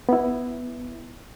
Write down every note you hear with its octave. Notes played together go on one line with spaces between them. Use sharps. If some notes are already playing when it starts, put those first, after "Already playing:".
B3 E4